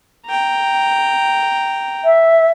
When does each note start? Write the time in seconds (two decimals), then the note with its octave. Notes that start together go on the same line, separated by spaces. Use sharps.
0.27 G5 A#5
2.05 E5